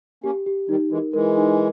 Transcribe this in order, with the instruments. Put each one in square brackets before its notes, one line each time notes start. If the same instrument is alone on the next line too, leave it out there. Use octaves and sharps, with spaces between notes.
[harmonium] A#3 C#4 [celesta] G4
[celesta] G4
[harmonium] D#3 G3 [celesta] D#4
[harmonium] E3 G#3 [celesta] A#4
[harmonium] E3 G#3 [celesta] A#4
[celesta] D#4